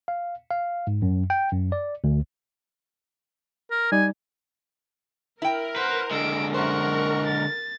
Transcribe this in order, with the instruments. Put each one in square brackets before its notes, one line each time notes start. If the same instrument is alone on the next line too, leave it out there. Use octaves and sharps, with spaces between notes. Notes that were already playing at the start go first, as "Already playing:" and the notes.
[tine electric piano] F5
F5
G#2
F#2
G5
F#2
D5
D2
[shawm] A#4
[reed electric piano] G3 D#4 D5 [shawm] G#5
[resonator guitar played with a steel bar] E4 G5 [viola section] A#4
[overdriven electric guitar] B4 [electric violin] C5 F#5
[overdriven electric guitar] D3 G#3 [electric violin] E6 D7
[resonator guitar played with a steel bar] F#2 C5 [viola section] A#4 [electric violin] F#5 C#6
[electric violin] A6